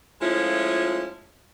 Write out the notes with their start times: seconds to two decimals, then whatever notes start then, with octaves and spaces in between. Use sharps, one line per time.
0.21 F3 G#3 A3 C#4 E4 F4